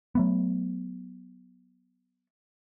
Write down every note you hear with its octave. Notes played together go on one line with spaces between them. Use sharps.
F#3 A3 B3